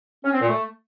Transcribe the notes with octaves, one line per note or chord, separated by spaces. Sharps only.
C#4
C4
A#2
A3